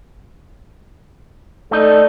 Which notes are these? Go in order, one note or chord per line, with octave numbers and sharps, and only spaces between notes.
A3 D#4 A4 D5